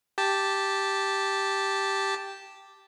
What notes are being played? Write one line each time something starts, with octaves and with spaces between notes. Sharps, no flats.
G4 A5